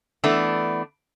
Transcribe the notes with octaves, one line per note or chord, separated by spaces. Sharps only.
E3 A3 B3 D4